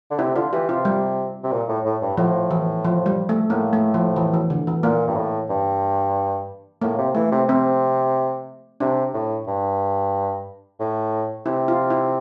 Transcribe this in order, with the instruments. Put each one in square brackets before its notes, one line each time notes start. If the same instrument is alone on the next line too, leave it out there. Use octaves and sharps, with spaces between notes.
[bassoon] D3
[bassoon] C3 [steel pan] E4
[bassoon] D3 [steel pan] F4
[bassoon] E3 [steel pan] G4
[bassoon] C3 [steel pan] F4
[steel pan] G3
[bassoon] C3
A#2
A2
A2
G2
[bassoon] A2 [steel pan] F3
[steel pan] E3
F3
G3
A3
[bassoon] A2 [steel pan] A#3
[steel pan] A3
F3
E3
E3
D3
E3
[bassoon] A#2 [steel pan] A#3
[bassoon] G2
A2
G2
[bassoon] A2 [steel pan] A#3
[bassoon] C3
[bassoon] E3 [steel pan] A3
[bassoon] C3
[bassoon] C3 [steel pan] C4
[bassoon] C3 [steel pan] D4
[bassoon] A2
G2
A2
[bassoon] C3 [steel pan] E4
[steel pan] F4
E4